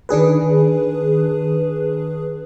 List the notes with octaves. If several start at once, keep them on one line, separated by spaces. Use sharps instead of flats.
D#3 D4 G#4 B4